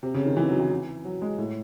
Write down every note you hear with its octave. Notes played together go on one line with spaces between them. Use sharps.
C3
C#3
D#3
E3
F#3
E3
E3
F#3
G#3
A2